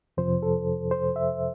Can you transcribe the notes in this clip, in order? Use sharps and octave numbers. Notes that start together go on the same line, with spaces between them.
F2 C3 F3 C5
A4
C5
E5